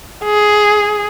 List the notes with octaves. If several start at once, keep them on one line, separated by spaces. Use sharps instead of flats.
G#4